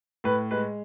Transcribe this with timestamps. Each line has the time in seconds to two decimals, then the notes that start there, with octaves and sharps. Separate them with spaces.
0.24 A2 B4
0.51 G#3 B4